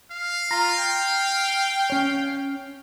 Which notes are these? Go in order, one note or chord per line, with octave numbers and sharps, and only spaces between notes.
F5
F4 A#5
G5
C#4 C#5